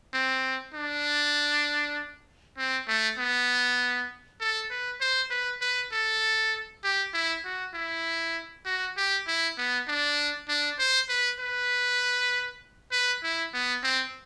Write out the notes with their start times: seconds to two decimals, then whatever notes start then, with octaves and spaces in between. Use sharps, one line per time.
0.14 C4
0.74 D4
2.58 C4
2.88 A3
3.18 B3
4.40 A4
4.70 B4
5.01 C5
5.31 B4
5.61 B4
5.92 A4
6.83 G4
7.14 E4
7.45 F#4
7.74 E4
8.66 F#4
8.97 G4
9.27 E4
9.58 B3
9.88 D4
10.49 D4
10.79 C5
11.09 B4
11.40 B4
12.92 B4
13.23 E4
13.54 B3
13.83 C4